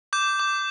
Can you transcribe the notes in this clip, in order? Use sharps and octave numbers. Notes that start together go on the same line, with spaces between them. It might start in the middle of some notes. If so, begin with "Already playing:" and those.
D6 G6
D6